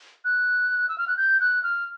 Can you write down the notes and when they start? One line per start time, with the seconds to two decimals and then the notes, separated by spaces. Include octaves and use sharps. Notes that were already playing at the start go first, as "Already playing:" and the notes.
0.25 F#6
0.89 E6
0.98 F6
1.08 F#6
1.17 G6
1.40 F#6
1.63 F6